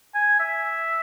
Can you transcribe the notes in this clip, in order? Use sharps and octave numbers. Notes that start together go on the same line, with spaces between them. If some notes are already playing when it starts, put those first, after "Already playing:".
G#5
E5